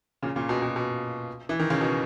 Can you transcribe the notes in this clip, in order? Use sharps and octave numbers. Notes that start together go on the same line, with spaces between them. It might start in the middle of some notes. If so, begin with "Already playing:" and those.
A#2 C#3
A#2 C#3
B2
B2
B2
E3
D#3
C#3
B2